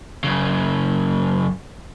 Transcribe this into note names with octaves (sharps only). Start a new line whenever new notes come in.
F#2 C#3